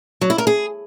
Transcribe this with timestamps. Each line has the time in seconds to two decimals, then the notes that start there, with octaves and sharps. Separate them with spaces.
0.21 F#3
0.30 E4
0.38 A#4
0.47 G#4